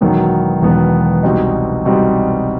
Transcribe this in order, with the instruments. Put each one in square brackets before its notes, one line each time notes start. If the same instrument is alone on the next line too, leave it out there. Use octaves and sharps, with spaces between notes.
[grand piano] E1 E2 D#3 F#3 B3
E1 E2 D#3 F#3 B3
C2 B2 G3 C4 D#4
C2 B2 G3 C4 D#4